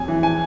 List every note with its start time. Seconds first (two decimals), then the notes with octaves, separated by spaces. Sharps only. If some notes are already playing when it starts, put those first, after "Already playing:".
Already playing: F2 G#5
0.08 E3
0.23 G#5